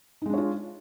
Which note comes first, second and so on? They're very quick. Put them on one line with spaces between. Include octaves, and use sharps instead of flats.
D#4 G#3 D4 C#5 F4